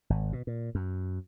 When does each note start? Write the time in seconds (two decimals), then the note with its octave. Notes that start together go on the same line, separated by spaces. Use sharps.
0.10 G#1
0.33 B2
0.47 A#2
0.75 F#2